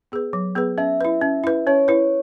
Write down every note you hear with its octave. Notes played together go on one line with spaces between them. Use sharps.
B3 G#4 B4
F#3
B3 G#4 B4
C#4 E5
E4 B4
C#4
E4 B4
C#4 C#5
E4 B4